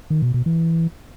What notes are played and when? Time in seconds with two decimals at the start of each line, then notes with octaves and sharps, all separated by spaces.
0.10 D#3
0.22 B2
0.34 B2
0.46 E3